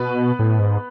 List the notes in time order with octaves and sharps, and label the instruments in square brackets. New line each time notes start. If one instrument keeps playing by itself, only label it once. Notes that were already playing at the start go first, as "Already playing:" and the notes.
Already playing: [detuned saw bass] B2 [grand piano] B3 B4
[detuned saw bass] A2
G#2